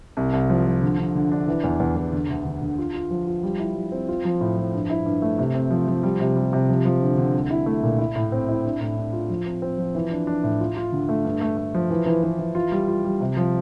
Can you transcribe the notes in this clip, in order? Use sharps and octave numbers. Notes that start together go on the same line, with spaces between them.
C2
C2
F3
F3
D3
D3
D3
D4
E3
E2
E2
E2
D3
D2
D3
D3
F4
F4
F3
F4
G3
E4
G3
C4
F4
F3
A2
F3
G2
E4
G2
A3
C3
C4
F3
F3
G3
C3
G3
C3
F3
F3
D3
D3
C2
E4
A3
A#2
E4
A2
C4
E4
D4
A2
D4
F4
F3
C4
C4
F3
E3
D4
D4
A2
F4
F4
D3
A3
G2
A3
A3
F3
E3
E3
E3
E3
F4
G3
F4
G3
C3
F3